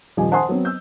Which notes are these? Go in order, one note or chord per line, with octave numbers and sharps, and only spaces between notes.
D#1 F3 G3 G4 D#5 G#5
C5 F#5 G#5 A5 C6 D#6
F#3 B3 C4
E6 G6